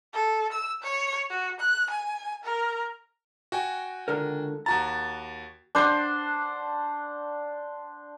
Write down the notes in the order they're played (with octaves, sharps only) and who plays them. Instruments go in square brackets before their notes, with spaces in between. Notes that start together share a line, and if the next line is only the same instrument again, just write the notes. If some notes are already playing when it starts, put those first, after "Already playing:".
[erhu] A4
E6
C#5
F#4
F#6
G#5
A#4
[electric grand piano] F#4 G5 G#5
[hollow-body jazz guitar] C#2 D3 A#4
[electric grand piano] D#2 F#4 A6 [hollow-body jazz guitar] A#5
[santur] D4 C5 F#5